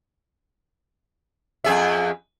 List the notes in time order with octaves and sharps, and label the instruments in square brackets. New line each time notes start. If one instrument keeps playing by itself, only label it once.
[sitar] F2 G#4 E5